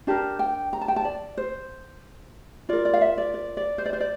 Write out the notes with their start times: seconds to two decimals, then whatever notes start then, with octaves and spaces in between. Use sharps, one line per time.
0.07 D4 G4 A#4 A5
0.39 G5
0.73 A#5
0.81 A5
0.88 G5
0.96 A5
1.05 D5
1.37 C5
2.69 F4 A#4 D5
2.85 D5
2.93 F5
3.01 E5
3.18 D5
3.34 D5
3.57 D5
3.78 C5
3.86 D5
3.93 C5
4.00 D5